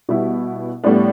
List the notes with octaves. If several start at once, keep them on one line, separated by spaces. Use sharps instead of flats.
B2 G3 B3 E4
A2 G3 B3 D4